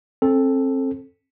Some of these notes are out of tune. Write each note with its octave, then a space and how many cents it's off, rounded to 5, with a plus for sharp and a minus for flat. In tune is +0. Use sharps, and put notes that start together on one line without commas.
C4 +30 A4 +0